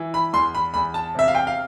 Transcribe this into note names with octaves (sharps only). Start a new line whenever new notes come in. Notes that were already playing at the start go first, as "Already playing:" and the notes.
Already playing: E3
B5
E2 C6
B5
E2 B5
A5
C3 E5
F5
G5
F5